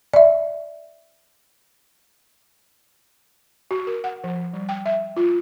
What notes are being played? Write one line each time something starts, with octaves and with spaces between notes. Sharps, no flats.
D5 E5
F#4
A#4
F#5
F3
G3
G5
E5
F4